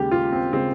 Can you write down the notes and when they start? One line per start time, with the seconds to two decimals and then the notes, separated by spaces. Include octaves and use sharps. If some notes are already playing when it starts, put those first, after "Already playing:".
Already playing: D#2 C#3 G#3 G4
0.11 F4
0.32 C4
0.53 C#3 G#3 C4